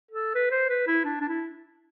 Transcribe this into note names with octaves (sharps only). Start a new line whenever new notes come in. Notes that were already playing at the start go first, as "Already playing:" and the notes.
A4
B4
C5
B4
E4
D4
D4
E4